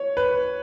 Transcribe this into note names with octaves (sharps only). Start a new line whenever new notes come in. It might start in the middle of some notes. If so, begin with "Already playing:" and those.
Already playing: C#5
B4